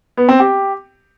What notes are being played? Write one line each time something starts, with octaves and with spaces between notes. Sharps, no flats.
B3
C4
G4